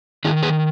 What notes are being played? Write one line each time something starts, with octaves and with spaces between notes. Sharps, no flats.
D#3 E4 G#4
G#4 B4